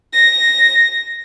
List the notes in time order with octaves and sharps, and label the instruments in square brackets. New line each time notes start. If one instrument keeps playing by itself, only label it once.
[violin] A#6